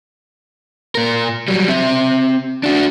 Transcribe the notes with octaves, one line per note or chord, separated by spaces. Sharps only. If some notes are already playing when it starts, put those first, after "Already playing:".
A#2 A#4
F#3 G3
C4 E5
D4 F#4